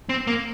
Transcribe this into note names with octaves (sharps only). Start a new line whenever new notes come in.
C4
A#3